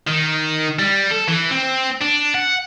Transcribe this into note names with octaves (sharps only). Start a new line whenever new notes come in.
D#3
G3
A4
E3
C4
D4
F#5